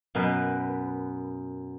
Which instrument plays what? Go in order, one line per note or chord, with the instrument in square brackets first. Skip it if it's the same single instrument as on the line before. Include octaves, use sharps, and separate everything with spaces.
[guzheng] F#2 B2 A#4 B4